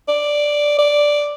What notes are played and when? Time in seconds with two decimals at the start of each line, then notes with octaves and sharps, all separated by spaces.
0.08 D5
0.78 D5